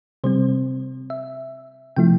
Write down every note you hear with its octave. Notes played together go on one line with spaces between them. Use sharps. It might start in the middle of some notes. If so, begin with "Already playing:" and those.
C3 G3 C4 C5
E5
C3 F3 A3 E4 G5